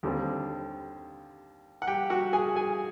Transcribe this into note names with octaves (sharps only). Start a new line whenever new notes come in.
D#2 D3 G3 C4
F#5
G4 G5
F#4 F#5
G#4 G#5
G#4 G#5